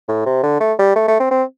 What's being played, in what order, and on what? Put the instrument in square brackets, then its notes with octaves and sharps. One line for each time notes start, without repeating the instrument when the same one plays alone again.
[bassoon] A2
C3
D3
A3
G3
A3
A3
C4
C4